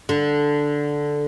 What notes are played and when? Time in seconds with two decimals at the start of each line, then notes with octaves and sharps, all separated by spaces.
0.09 D3